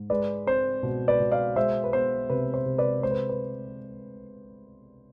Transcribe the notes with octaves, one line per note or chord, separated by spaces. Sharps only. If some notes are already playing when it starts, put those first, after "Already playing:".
Already playing: G#2
G#3 B4 D5
C4 C5
B2
B4 D5
B2
D5 F5
G#3 C5 E5
B4
B3 C5
C3 B4
C5
C3
B4 D5
G#3 C5
B4
B4